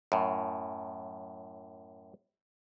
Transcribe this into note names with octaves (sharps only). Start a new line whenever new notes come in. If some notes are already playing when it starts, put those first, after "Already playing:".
F#2 A2